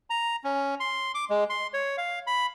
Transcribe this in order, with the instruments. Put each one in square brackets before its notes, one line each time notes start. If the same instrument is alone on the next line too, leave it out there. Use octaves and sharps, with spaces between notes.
[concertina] A#5
C#4
C6
D6
G#3
C6
C#5
F5
B5